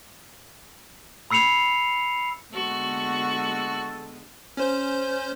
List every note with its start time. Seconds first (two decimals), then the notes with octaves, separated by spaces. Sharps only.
1.31 B5 E6 C7 C#7 F7
2.53 D3 G#3 B3 F#4 A4 C#6
4.57 C#4 C5 G6